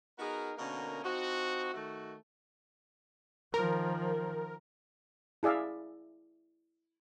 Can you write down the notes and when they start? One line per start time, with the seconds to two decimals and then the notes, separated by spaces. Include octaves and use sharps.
0.19 B3 D#4 F#4 G#4 A#4
0.58 B2 D3 A#3 C#4 D#4 A#4
1.04 F3 C4 D#4 F#4
1.74 D#3 A3 F#4
3.54 D#3 F3 A#4
5.43 E4 G#4 D5 E5 F5